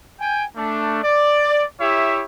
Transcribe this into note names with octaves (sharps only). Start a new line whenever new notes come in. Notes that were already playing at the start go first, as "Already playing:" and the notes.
G5 G#5
A3 D4
D5
E4 G4 C#5 E5